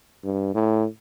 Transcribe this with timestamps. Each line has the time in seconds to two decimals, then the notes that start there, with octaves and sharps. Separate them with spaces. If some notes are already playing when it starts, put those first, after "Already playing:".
0.25 G2
0.54 A2